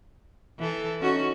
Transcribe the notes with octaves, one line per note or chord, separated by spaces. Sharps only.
E3 A4
C#4 D#4 F#4